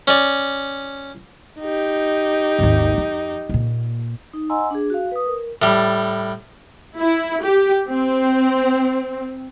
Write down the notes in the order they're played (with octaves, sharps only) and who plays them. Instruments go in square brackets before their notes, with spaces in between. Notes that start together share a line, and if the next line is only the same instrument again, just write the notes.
[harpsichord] C#4 D5
[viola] D#4 G4
[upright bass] G#1 D#2
F2
A#2 A#3
[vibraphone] D#4
D#5 F#5 G#5 A#5 C6 E6
D4 G#4
F#4 F5
B4 D#6
A#4
[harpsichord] A2 G3
[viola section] E4
G4
C4